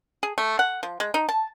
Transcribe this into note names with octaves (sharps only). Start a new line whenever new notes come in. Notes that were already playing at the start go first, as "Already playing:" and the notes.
G#4
A3
F#5
F3
G#3
D#4
A5